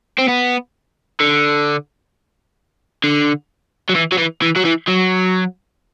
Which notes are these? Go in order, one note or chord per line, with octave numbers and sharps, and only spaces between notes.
C4
B3
D3
D3
F#3
E3
F#3
E3
E3
F#3
E3
F#3